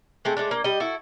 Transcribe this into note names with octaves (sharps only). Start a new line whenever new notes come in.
G#3 A3 C4
G#3 A3 D4
A#3
G3 D#5
E4 F#4 A4